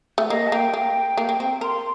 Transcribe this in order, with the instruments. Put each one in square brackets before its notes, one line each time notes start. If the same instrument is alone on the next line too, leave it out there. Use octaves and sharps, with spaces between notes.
[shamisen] A3
[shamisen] A#3 [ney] D#5
[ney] A5
[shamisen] A#3 [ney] G5
[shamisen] A#3 [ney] G5
[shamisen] A#3
A#3
C4
[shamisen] A#4 [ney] C6